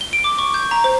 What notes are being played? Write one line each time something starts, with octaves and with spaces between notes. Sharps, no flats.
G7
D7
D6
C#6
G6
A#5
C5